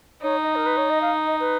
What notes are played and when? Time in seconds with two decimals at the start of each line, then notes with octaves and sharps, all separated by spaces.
0.22 D#4 C#5
0.43 D#5
0.55 A#4
0.66 B4
0.77 C#5
0.90 D#5
1.01 F5
1.26 D#5
1.40 B4